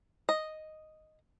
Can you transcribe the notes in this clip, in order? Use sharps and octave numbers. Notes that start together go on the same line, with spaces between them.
D#5